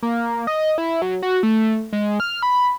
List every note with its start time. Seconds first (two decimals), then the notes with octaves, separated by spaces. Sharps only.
0.03 A#3
0.47 D#5
0.78 E4
1.02 F#3
1.23 F#4
1.43 A3
1.93 G#3
2.20 F6
2.42 B5